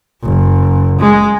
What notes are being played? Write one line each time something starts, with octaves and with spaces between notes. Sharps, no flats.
F#1
G#3